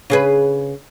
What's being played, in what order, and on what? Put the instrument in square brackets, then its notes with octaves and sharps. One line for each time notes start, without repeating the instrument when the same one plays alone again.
[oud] C#3 G#4 B4